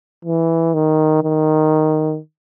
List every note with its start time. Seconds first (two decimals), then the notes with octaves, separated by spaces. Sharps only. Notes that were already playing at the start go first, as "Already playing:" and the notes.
0.25 E3
0.74 D#3
1.24 D#3